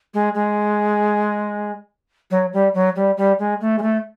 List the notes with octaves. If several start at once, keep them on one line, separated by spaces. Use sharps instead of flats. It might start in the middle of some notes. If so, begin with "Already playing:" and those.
G#3
G#3
F#3
G3
F#3
G3
G3
G#3
A3
G#3
A3